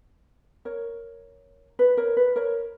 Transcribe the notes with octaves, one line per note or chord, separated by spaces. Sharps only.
A#4 C#5
B4
A#4 C#5
B4
A#4 C#5